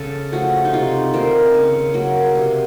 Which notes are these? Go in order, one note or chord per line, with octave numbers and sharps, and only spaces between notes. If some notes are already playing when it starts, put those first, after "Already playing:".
Already playing: C#3 A4
F3 A3 F#4
D#4
C3 F4
D#3 A#3 C4
C#3
F#3 A#3
C3